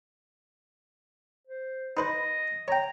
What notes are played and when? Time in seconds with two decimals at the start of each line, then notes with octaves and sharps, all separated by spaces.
1.47 C5
1.97 D#4 B4 C5 D#5
2.68 C#5 G5 A#5